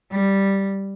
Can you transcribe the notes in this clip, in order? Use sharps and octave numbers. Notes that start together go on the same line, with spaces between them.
G3